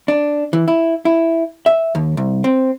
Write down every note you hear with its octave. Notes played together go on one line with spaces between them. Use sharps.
D4
E3
E4
E4
E5
D#2
C2
C4